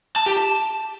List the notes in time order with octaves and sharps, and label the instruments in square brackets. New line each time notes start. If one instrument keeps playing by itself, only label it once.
[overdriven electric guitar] A5
G4
A5